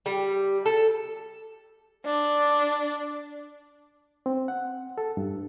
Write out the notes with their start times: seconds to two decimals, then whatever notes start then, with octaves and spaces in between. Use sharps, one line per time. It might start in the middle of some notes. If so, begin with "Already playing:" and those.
0.06 G3
0.66 A4
2.05 D4
4.26 C4
4.48 F#5
4.98 A4
5.17 G2